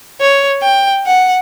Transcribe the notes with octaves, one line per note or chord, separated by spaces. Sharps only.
C#5
G5
F#5